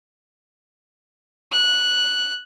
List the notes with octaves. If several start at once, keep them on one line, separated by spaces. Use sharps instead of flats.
F#6